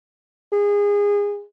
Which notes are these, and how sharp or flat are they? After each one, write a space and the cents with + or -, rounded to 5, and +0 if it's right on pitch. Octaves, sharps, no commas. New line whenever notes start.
G#4 -25